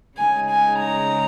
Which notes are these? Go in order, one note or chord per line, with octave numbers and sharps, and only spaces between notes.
C#3 G#3 D#4 G#5
G#5
A#5